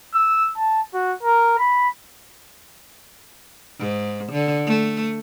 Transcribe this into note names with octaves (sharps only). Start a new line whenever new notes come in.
E6
A5
F#4
A#4
B5
G#2
D3
A3